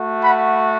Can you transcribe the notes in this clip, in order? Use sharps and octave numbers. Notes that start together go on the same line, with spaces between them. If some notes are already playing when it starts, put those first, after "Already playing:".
Already playing: A3 F#4
F#5 B5